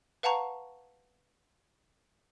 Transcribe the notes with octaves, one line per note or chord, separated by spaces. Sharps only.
B4 F5 F#5 A5 A#5 C#6